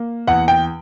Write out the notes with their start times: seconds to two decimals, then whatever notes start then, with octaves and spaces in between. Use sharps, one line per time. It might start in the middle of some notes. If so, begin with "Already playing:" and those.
Already playing: A#3
0.27 E2 F#5
0.48 G5